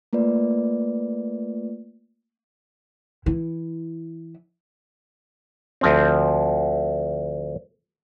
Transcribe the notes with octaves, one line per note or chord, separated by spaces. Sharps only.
A3 A#3 F4 B4 D5
E3 E4
D2 F3 C4